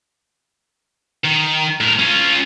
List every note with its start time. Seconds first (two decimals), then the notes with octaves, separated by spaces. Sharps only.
1.24 D#3
1.81 A2 A#4
1.99 C#4 F4